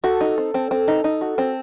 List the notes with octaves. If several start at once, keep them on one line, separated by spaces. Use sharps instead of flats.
F#4 A4
D#4
C4
C4
C4
D#4
D#4
F#4
C4